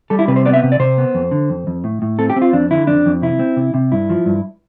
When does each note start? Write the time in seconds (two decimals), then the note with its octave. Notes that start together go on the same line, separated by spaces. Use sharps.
0.10 G3 A4
0.19 E4
0.28 C3 B4
0.36 C5
0.45 B3 D5
0.53 E5
0.63 C3
0.72 D5
0.79 C3 C5
0.98 B3
1.15 F2
1.31 D3
1.50 F2
1.67 F2
1.84 A2
2.02 A2
2.19 C4 A4
2.30 G4
2.36 C4
2.42 F4
2.53 F2 D4
2.71 D3 E4
2.87 F2 D4
3.06 F2
3.22 C3 E4
3.39 C4
3.57 C3
3.74 C3
3.92 G2 E4
4.10 F3
4.26 G2